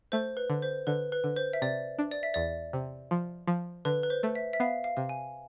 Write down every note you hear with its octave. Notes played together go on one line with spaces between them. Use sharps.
A3 C5
B4
D3
C5
D3 B4
B4
D3
C5
E5
C3 D5
D4
D5
E5
E2 D5
C3
F3
F3
D3 B4
B4
C5
A3
E5
E5
B3 F5
F5
C3
G#5